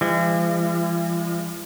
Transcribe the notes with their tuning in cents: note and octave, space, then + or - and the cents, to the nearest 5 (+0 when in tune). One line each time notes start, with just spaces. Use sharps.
F3 -45 G#3 -35